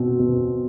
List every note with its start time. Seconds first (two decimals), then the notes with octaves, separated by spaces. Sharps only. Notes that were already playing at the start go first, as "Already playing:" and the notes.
Already playing: B2 C4
0.19 B2